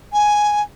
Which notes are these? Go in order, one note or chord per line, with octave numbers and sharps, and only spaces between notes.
G#5